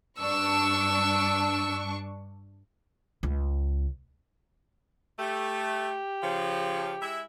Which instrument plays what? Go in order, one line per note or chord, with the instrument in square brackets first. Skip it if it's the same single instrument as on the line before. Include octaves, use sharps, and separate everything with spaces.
[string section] G2 D4 C#6 [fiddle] E6
[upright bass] C#2
[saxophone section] A3 [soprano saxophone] G4
[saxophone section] C#3 F3
G#3 E4 E5